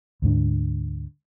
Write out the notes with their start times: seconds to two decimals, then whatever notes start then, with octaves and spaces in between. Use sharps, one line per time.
0.22 D2 G#2 D3